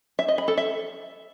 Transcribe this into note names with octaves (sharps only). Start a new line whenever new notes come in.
E5
D#5
B5
A4
E5